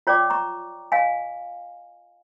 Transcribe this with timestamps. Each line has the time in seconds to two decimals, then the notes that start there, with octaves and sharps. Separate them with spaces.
0.07 F4 C#5 D5 G5 D6
0.30 A#5 C#6
0.92 D#5 F5 G#5